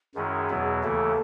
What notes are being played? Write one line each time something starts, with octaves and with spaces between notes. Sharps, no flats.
F#2 D#3 G#3 C#4 E4 G#4
E2 B2 F#3 B3 E4
D#2 C#3 E3 A3 E4 A4